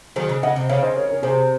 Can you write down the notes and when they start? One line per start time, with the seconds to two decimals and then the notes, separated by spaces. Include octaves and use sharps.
0.16 D#3 F#3 G#4 C5
0.29 C#3
0.43 C#3 D#5 F#5
0.56 C3
0.69 C#3 C#5 F5
0.83 C5 D#5
0.96 A#4 C#5
1.09 A#4 C#5
1.23 C3 G#4 C5